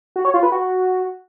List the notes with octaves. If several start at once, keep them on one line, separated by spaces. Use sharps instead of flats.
F#4
C#5
F4
B4
F#4